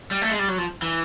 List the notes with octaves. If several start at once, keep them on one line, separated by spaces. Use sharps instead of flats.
G3
A3
G#3
G3
F#3
F3
E3